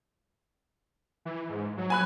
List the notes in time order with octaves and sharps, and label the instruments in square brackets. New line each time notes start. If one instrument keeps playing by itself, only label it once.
[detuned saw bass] E3
G#2
F#3
[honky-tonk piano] G#5 B5 F#6